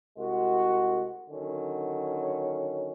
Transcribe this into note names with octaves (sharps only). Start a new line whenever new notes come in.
C2 G#3 F#4
D3 D#3 F#3 C#4